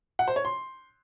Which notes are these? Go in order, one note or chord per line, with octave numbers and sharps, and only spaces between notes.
F#5
C5
C#5
C6